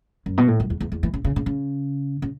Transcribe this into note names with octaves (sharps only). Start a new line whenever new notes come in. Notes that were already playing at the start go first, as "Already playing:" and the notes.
F#2
B2
A2
F#2
E2
E2
E2
E3
C#3
C#3
C#3
C#3
C#3